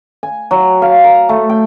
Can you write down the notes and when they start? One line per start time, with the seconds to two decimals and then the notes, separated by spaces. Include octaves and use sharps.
0.23 G#5
0.51 F#3
0.82 F5
1.04 A#5
1.29 A3
1.49 G5